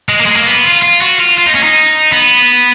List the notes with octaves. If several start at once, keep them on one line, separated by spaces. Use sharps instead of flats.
G#3
A#3
G#3
A#3
B3
F4
F4
F#4
F4
F4
D#4
C#4
D#4
B3